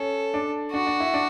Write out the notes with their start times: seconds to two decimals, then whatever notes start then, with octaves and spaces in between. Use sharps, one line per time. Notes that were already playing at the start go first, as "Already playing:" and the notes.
Already playing: C#4 A4
0.34 D4
0.73 D4 F#4
0.87 D4
1.00 E4
1.14 D4